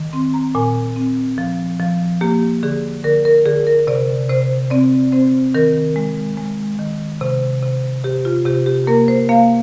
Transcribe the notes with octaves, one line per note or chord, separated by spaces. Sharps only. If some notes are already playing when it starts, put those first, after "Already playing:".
Already playing: D#3
C4 C6
A#5
A#2 G#5
C4
F3
F3
A#3 G4
D3 G#4
D3 A#4
A#4
D3 G#4
A#4
C3 D5
C3 C5
C4 D5
C4 C5
D#3 A#4
G#3
G#3
D#3
C3
C3
C3 G4
F4
C3 G4
G4
A#3 A#4
C5
A#3 F5